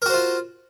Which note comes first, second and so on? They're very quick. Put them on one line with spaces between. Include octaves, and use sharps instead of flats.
A#4 F#4 C5 F4